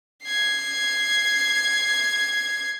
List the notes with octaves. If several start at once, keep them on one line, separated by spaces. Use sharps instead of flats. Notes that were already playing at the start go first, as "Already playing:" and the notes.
G#6 C7